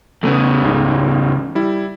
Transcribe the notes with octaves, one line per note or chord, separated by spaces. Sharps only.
E2 C#3 A3 B3
C#2 G#2
G3 E4